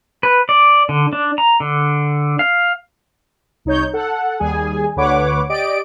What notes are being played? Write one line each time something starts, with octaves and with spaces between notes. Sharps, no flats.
B4
D5
D3
D4
A#5
D3
F5
C2 D#4 C#5 G6
A4 F#5
D#2 G3 G#4 G#5
D2 D3 B4 C#5 F#5 D6
G4 D5 D#5 D7